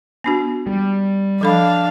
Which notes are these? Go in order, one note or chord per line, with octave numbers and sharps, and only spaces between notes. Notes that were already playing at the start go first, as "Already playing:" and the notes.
B3 D4 F#4
G3
F3 D4 A4 F5 B5